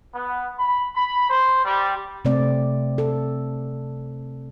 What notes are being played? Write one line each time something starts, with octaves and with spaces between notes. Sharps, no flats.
B3
B5
B5
C5
G3
C3 A3 C4 D5
A4